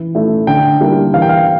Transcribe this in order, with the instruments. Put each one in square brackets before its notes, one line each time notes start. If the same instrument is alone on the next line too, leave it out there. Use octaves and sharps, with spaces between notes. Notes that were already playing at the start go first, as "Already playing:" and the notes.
Already playing: [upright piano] E3
A3 E4
[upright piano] D3 [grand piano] G5
[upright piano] G3 A#3 E4
[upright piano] E3 [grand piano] F5
[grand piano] G5
F5